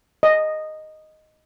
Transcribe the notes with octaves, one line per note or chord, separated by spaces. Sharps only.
D#5